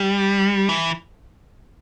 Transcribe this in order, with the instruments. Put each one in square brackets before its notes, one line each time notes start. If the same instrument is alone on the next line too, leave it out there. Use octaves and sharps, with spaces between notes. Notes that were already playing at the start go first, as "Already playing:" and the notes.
Already playing: [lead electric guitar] G3
E3